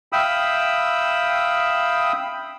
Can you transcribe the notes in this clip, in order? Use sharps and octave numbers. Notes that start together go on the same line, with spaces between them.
E5 F5 G5 B5 D#6 E6